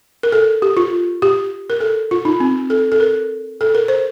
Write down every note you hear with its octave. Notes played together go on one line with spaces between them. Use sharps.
A#4
A4
G4
F4
G4
A#4
A4
F4
D#4
C4
A4
A4
A#4
A4
A#4
C5